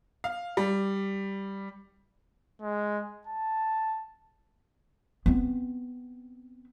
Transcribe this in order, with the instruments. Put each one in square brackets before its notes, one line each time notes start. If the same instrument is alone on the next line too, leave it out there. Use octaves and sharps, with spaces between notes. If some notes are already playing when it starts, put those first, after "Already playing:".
[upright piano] F5
G3
[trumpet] G#3
A5
[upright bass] B3 C4